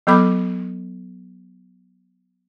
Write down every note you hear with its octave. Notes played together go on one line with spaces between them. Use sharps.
F#3 B3 A4 B5 D6